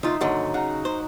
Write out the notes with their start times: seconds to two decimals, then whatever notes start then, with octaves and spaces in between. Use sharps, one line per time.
0.03 D2 D#4 F4 E5
0.21 D#2 G#2 D3 F#3 D#5
0.54 C#3 F#5 A#5
0.85 C5